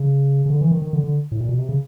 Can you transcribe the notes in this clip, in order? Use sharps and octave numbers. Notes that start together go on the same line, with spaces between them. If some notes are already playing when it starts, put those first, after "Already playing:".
Already playing: C#3
C#3
D3
E3
D#3
D#3
D3
D3
A2
A#2
B2
C3
C#3